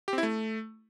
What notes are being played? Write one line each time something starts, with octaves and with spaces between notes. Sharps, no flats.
G4
C4
E4
A3